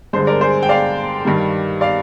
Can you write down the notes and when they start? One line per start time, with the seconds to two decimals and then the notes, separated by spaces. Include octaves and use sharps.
0.13 G2 D3 G#3 G#4 C5
0.27 A#4 D5
0.41 G#4 C5
0.63 G5
0.69 D5 F5
1.25 G2 D#3 G3
1.81 D5 F5